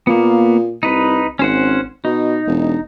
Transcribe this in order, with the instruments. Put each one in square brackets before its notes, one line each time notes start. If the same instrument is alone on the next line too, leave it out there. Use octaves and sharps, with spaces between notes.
[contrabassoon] A#2 [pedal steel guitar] A#3 B3
[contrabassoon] C2 [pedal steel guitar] D#4 B4
[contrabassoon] G#1 [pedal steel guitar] C#4 C5 F#5
[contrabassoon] B2 [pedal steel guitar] D#4
[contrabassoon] E1